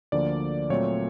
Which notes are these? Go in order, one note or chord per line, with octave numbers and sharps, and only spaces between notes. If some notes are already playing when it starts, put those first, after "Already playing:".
D2 D3 F3 A#3 D5
A#2 F#3 A3 C4 C#5